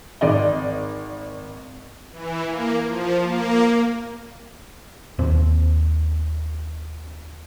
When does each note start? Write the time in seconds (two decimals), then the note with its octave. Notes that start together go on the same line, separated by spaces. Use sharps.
0.21 G#1 D5 D#5
2.12 E3
2.48 A#3
2.86 F3
3.22 A#3
5.19 D#2 C4